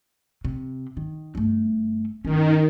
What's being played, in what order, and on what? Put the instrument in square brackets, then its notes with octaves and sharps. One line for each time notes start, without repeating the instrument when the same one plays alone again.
[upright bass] C3
D#3
G1 A3
[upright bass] G1 C#4 [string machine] D#3